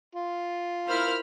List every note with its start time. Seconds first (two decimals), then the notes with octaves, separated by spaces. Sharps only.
0.15 F4
0.88 E4 A#4 C5 B5 F6